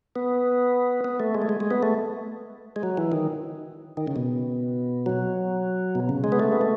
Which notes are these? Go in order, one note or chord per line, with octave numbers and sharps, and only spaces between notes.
B3
B3
A3
G#3
A3
G#3
G#3
B3
A3
G#3
F#3
E3
D#3
D#3
C#3
B2
F#3
B2
C#3
G#3
B3
A3
B3
A3